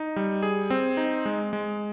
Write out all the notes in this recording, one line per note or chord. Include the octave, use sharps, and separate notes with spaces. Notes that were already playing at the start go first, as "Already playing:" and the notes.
Already playing: D#4
G3
G#4
C4
D#4
G#3
G#3